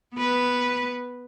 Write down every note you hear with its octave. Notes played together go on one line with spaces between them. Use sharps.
B3 B4